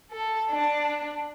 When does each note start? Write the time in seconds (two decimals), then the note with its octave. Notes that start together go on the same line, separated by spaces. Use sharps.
0.10 A4
0.50 D4